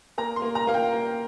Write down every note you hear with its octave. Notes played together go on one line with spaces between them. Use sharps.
A#3 A#5
C6
A#3
A#5
A#3 F5
G5
A#3